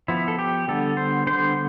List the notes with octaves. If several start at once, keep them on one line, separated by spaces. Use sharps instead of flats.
F3 B3 E4
A4
G4
D3 G3 B3 A4
C5
D3 G3 B3 C5